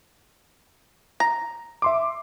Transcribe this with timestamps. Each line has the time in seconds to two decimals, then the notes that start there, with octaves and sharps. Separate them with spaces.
1.20 A#5
1.82 E5 C6 D6